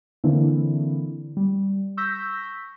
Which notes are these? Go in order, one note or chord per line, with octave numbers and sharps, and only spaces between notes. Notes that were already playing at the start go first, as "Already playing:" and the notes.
D3 E3 A#3 C4 D4 E4
G3
C#6 E6 G6 A#6 B6